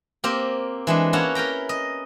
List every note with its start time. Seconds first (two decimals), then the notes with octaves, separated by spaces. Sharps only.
0.24 A#3 C4 G4 A#4
0.87 E3 G#3 D4
1.13 A#3 C#4 E4 C#5 F#5 A5
1.35 A#4 B4 G5 A#5
1.69 D#5